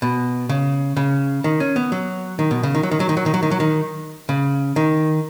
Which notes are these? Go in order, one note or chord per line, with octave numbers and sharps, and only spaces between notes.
B2
C#3
C#3
D#3
C#4
B3
F#3
D#3
B2
C#3
D#3
F#3
D#3
F#3
D#3
F#3
D#3
F#3
D#3
F#3
D#3
C#3
D#3